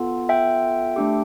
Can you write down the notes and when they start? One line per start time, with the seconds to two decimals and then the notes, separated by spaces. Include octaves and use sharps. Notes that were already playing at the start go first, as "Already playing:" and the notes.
Already playing: B3 F4 A4
0.29 E5 G5
0.96 A3 D4 G4